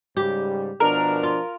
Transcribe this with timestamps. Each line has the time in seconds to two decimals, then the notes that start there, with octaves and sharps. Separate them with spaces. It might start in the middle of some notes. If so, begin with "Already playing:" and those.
0.17 G#2 C#3 G3 G4
0.80 B2 F3 D4 A#4
1.23 F4